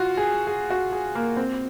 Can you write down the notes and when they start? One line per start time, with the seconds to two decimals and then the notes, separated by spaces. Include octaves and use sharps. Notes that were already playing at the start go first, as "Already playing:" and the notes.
Already playing: F4 F#4
0.17 G#4
0.47 G#4
0.70 F#4
0.92 G#4
1.15 A#3
1.37 C4